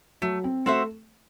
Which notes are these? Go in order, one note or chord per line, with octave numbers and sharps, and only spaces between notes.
F#3 A3
C4
A3 C4 F#4 C5 E5